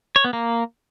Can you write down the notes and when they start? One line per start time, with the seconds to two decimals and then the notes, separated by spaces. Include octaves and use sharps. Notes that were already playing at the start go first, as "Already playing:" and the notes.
0.16 C#5
0.24 B3
0.33 A#3